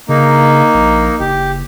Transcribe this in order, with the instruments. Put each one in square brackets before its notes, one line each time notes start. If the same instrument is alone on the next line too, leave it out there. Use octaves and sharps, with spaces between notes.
[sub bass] C#3 [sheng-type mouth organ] A#3 D#4
[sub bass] A#1
[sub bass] F#1 [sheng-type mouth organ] G4